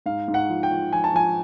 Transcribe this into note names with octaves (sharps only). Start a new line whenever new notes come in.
G#2 F5
G#2
F#5
F3
G5
F3
F3 G#5
A5
F3 G#5